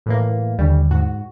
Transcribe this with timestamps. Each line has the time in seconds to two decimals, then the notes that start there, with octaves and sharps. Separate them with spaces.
0.06 A2 E3 A#3
0.59 D#2 D3 G3
0.90 G#2 F#4